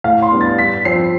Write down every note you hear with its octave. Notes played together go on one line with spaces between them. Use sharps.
A2 F5
C6
G3 B3 D4
A6
G2 B6
F3 C4 C7